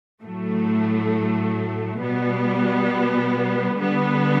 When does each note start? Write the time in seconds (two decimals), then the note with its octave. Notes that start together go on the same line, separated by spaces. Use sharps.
0.22 A2 F#3 A3
1.99 B2 G3 B3
3.77 D3 G3 B3